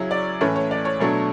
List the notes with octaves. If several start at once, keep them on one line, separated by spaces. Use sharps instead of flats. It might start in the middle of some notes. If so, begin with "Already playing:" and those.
Already playing: C#3 F#3 C#4 E4 C#5
D5
A2 E3 A3 C#4 C#5
C#5
D5
C#5
B2 F#3 A3 D4